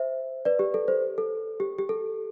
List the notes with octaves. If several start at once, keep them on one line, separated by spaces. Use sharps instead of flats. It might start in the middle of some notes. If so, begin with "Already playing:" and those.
Already playing: C5 E5
B4 D5
G4
A4
C5
A4
G4
G4
A4